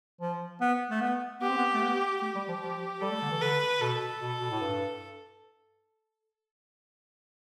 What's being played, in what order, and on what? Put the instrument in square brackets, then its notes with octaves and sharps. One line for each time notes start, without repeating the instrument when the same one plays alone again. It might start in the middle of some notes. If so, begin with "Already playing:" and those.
[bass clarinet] F3
B3
A3
B3
[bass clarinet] B3 [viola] G4
[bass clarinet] C4
B3
A3
B3
[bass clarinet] A3 [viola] G4
[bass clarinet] G3
F3
F3
[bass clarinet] G3 [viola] A4
[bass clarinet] A3
D3
E3
[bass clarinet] D3 [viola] B4
[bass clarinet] B2 [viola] A4
[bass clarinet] B2
B2
A2
G2